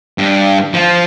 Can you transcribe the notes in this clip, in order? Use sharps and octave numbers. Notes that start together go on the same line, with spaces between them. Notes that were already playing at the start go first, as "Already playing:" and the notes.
G2
F3